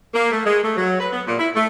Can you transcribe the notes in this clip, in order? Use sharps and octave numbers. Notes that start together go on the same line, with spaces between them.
A#3
A3
G#3
A3
F#3
B4
B3
A#2
E4
A3